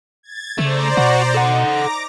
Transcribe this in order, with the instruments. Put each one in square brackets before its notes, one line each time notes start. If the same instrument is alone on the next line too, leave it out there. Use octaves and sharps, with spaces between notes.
[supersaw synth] G#6 A6
[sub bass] C#3 [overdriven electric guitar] A3 [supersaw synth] C5 D5 A#5
[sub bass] B2 [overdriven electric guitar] F#4
[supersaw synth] D#4 [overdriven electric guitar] A4 F#5
[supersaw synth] A#5 D6 A#6